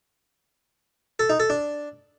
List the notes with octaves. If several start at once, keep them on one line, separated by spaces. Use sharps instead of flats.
A4
D#4
A4
D4